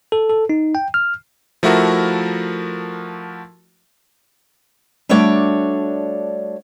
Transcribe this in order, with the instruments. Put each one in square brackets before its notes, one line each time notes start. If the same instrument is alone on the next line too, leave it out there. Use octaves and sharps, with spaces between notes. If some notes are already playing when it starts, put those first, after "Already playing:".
[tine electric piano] A4
A4
D#4
G5
F6
[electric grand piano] F3 A3 E4 F#4 A#4
[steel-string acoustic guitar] G3 A3 D4 F#4 C#5 D5